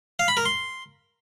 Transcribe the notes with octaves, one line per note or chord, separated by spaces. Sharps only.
F5
B5
A#4
C6